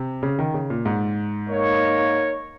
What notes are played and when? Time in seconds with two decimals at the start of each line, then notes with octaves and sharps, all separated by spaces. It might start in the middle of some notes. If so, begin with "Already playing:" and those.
Already playing: C3
0.23 C#3
0.39 D#3
0.54 C#3
0.70 A#2
0.86 G#2
1.47 A#3 D#4 A#4 C#5